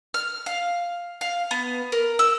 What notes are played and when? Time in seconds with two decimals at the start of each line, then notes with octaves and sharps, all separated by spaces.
0.14 F6
0.46 F5
1.21 F5
1.51 B3
1.92 A#4
2.19 E6